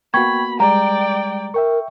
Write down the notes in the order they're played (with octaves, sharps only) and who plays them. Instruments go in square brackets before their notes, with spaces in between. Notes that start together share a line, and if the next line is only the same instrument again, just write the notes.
[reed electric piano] A#3 B3 F#4 [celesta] G5 C#6 G#6 [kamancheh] B5
[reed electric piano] G3 G#3 [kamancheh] D5 G5 [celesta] A#5
[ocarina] A#4 [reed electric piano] E5 G5 C#6